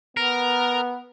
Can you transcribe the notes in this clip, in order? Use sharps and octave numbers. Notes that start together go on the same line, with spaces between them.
B3 A#4